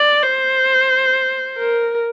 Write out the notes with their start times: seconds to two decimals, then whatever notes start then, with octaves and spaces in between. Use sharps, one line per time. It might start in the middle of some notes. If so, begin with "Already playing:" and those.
Already playing: D5
0.23 C5
1.58 A#4